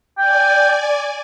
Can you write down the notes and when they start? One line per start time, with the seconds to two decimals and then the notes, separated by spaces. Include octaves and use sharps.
0.18 D5 G5 G#5